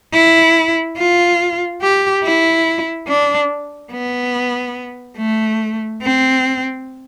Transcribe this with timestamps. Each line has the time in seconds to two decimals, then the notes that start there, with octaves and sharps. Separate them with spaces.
0.13 E4
0.98 F4
1.82 G4
2.24 E4
3.08 D4
3.92 B3
5.18 A3
6.02 C4